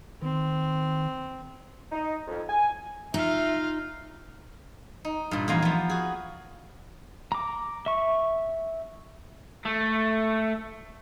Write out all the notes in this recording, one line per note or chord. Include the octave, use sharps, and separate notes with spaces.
D#3 C4
D#4
F2
G#5
D#4 F4 E5 F5
D#4
G2 A#2
E2 F3 A#3 C4 G#5 A#5
F3 B3
F#4 G#4
A#5 D6
E5 C#6
A3